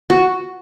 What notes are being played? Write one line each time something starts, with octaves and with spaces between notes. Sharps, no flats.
F#4